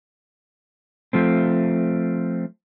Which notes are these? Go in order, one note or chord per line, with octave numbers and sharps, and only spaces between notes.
F3 A3 C4